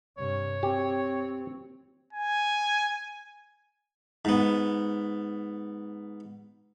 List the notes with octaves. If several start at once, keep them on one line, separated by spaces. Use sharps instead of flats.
G2 C3 C#5
C4 G4
G#5
G#2 B3